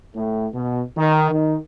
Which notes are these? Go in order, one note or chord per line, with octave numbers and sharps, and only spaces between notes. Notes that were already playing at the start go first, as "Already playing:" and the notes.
A2
B2
D#3
D#3